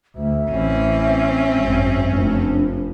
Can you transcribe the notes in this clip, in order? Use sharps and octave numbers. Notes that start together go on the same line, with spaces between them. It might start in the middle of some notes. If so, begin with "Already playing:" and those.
D2 E5
A1 E3 C4 C#4
G#1 F#2
F1 D4